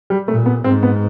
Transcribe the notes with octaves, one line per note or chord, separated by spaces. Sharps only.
G3
A#2 A3
B3
G#2 C4
B3